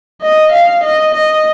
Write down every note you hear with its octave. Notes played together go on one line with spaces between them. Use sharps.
D#5
F5
D#5
D#5